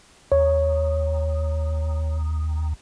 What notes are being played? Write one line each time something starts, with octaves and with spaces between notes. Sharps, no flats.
D#2 C#5